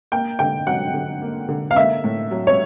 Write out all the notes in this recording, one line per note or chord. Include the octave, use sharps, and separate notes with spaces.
A#3 G5
D3 G5
F#3 F#5
D3
A#3
D3
F5
A#3 E5
A2
F#3
C#5